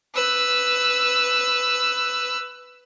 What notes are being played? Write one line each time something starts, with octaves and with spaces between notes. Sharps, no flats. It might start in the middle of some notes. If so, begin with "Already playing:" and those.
B4 E6